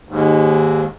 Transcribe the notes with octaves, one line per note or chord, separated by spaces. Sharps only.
D#2 G#2